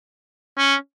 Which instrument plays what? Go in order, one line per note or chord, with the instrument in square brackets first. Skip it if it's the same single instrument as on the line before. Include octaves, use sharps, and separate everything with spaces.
[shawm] C#4